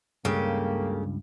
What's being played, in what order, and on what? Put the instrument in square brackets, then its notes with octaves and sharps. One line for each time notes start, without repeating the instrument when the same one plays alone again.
[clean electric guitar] C#2 G2 [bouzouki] C#3 G4 A4 [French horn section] A#3